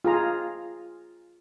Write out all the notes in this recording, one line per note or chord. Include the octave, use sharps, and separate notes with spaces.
F4 G#4 A#5